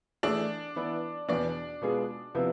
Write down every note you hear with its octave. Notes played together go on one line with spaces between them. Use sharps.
E3 A3 D4 E4 G#4 D5
E3 B3 E4 B4 D5
E2 B2 B3 D4 D5
B2 G#3 B3 F4 G#4
C3 F3 B3 E4 B4